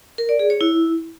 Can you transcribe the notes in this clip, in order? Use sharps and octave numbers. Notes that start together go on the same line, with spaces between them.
A#4
D5
G#4
C#5
E4